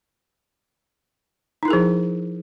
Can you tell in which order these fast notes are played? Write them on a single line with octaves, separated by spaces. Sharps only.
D#4 E4 A#4 G#4 F3